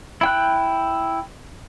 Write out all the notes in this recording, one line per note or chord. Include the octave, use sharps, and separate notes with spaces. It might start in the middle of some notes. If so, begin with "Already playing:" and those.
E4 G5 F#6